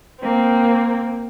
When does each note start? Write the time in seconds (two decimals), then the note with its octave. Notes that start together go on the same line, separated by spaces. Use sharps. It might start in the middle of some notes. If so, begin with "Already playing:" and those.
0.19 A#3 C4